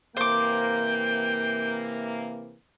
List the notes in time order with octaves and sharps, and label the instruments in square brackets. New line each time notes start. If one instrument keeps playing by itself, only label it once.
[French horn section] C3 E3 A#3 [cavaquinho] C5 D6 [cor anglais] G5